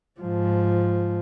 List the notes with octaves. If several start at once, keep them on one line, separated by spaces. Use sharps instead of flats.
G#2 F3